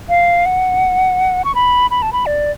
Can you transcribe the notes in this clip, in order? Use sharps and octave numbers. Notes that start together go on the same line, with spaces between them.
F5
F#5
C#6
B5
B5
A5
B5
D5